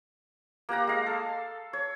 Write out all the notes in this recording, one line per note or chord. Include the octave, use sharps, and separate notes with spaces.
A#3 G4 F#5 A#5
G#3 F5
A4
C#5